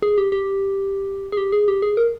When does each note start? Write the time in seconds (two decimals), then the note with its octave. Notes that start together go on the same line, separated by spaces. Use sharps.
0.02 G#4
0.18 G4
0.32 G4
1.32 G#4
1.37 G4
1.52 G#4
1.68 G4
1.82 G#4
1.97 A#4